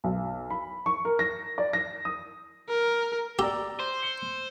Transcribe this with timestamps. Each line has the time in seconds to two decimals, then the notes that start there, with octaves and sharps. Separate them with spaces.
0.04 B1
0.50 B5
0.86 C#6
1.05 A#4
1.19 A#6
1.58 D5
1.73 A#6
2.05 D#6
2.69 A#4
3.39 G4 D5 A#5 E6
3.79 C5
4.03 C#7